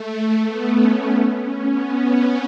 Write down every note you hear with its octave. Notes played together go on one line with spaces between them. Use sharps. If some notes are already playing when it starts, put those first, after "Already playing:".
Already playing: A3
B3
C#4
B3
C#4
B3
C#4